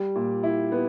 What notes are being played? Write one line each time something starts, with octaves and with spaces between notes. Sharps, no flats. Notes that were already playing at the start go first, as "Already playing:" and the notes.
Already playing: G3
A#2
E4
B3